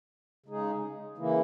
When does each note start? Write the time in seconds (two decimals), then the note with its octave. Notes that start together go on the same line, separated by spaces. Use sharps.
0.46 C#3 G#3 D#4 G#4
1.17 C#3 E3 A#3 E4